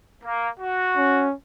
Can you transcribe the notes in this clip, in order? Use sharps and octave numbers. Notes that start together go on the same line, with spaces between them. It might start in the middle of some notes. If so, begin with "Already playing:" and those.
A#3
F#4
C#4